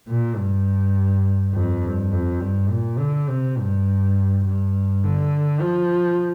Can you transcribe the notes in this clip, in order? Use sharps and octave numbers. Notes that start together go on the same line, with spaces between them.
A#2
G2
F2
G2
F2
G2
A#2
D3
C3
G2
G2
D3
F3